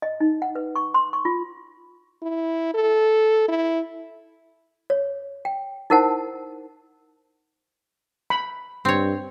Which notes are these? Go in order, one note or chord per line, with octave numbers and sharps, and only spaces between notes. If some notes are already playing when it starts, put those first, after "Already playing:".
D#5
D#4
F#5
B4
C#6
C6
C#6
F4
E4
A4
E4
C#5
G5
D#4 E4 A#4 C5 F#5 A5
B5
G2 C4 C#5